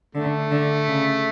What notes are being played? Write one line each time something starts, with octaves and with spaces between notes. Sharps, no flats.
D3 A3
D3
C#3